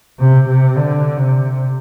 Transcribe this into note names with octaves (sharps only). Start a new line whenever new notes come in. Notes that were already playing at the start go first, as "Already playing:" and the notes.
C3
C3
D3
C3